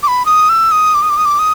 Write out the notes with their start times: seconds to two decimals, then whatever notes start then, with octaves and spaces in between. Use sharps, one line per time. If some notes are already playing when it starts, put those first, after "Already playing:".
0.03 D6
0.08 B5
0.26 D#6
0.49 E6
0.71 D#6
0.94 D6
1.02 D#6
1.10 D6
1.17 D#6
1.25 D6
1.39 D#6